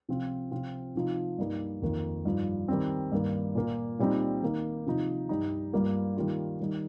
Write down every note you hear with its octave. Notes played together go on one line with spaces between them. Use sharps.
C3 F3 C4 F4
C3 F3 C4 F4
C3 F3 D#4
G2 G3 A#3 D#4
F2 D#3 A#3
G2 F3 D#4
D#3 G3 C4
G2 D#3 A#3
A#2 A#3 F4
A#2 G3 C4 D#4
D#3 A#3 D#4
C3 F3 D#4
G2 G3 D#4
G2 G3 A#3 F4
D#3 G3 A#3 F4
D#3 G3 D#4